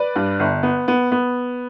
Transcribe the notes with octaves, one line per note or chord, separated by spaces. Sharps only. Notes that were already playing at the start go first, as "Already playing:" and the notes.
Already playing: B4 D5
G2
G1
B3
B3
B3